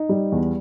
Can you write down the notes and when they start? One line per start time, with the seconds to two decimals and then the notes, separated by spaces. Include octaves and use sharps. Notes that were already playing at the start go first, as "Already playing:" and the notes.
Already playing: D#4
0.09 G3
0.32 E2